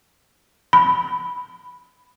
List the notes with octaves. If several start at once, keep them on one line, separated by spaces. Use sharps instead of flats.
B5